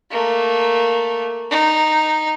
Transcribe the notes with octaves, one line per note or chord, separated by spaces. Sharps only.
A3 A#3
D#4